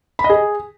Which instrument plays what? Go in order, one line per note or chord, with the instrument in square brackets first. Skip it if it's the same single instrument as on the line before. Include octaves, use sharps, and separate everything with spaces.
[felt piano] B5
D#5
G#4